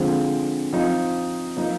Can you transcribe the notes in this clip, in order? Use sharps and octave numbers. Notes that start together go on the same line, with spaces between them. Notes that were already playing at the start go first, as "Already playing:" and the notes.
Already playing: D3 F3 G#3 C4
F3 C4 D#4
F3 A#3 D#4